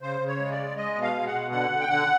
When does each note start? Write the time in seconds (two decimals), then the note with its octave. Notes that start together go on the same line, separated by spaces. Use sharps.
0.02 C#3 C5
0.21 C#3
0.27 C#5
0.39 G#3
0.52 D5
0.59 G#3
0.76 G#3 D#5
0.95 B2
1.02 F5
1.15 G#3
1.27 F#5
1.33 B2
1.52 D3 F#5
1.71 D3
1.80 G5
1.89 D3 F#5